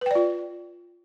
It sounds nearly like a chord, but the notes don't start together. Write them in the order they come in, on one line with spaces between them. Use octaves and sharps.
B4 G5 D5 F4